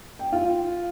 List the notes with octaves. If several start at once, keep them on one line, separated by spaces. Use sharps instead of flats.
G5
F4